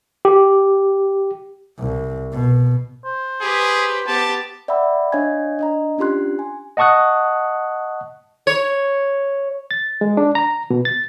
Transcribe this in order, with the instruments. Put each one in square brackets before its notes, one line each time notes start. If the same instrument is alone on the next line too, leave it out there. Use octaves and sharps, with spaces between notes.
[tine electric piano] G4
[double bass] C2
B2
[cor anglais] C5
[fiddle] G4 B4 [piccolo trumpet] G#4
[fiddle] B3 G4 [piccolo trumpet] A5
[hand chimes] D5 E5 F#5 G5 B5 E6
D4 C#5 D#5 F5 G#5 G#6
D4 D#5 A#5
C#4 D4 F4 G4 C6 F#6
G#5
[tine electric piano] D#5 F#5 A5 C#6 D#6 F#6
[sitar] C#5
[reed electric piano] A6
G#3
D4
A#5
B2
A6